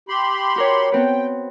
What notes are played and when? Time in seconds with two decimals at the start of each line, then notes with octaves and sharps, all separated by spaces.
0.09 G4 B5 C6
0.56 F#4 A#4 C#5
0.92 B3 C4 B4 G5